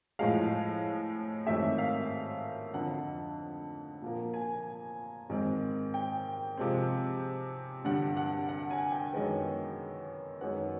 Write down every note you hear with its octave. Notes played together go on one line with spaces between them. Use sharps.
A2 F3 G#3 F5
G#2 D#3 F#3 A3 C4 E5
F5
F2 D3 F3 F#5
A#2 F3 A#3
G#5
G#2 D#3 G#3 C4
G5
C3 F3 G#3 C4
G2 D3 G3 F#5
F#5
F#5
G#5
G5
F#2 D#3 G#3 B3
F#2 D#3 G#3 B3 F#5